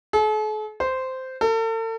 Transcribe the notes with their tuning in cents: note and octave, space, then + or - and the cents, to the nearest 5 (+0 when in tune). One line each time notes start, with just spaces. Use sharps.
A4 -45
C5 -10
A4 +40